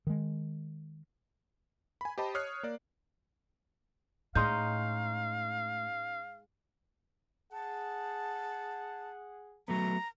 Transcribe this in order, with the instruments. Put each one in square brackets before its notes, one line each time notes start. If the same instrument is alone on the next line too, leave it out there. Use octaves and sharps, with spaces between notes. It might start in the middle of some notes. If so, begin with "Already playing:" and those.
[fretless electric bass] D#3 G#3
[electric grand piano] G#5 B5
G4 C5 D#5 A5 B5
C#5 D#6 F6 F#6 C7
A#3 D5
[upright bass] A2 [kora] G#3 C#4 D#4 [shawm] F5 [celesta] C6 G6
[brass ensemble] G#4 F#5 [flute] A5
[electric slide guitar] F#3 A3 B3 [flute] A#5